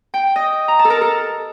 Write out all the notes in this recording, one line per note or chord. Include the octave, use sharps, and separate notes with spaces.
G5
D#5
A#5
A5
A4
A#4
A4